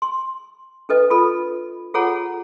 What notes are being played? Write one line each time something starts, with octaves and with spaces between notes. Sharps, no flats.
C6
D4 A4 B4 D#5
F4 A4 B5
F4 G#4 A4 C#5 F#5 A#5